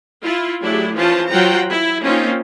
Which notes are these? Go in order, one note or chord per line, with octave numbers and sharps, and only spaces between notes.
E4 F4
F#3 A3 D4 E4 G4 G#4
E3 F3 C#4 F4 C5 A5
F#3 F4 C5 F#5 G5 A#5
E4
A#3 C4 C#4 D#4 F4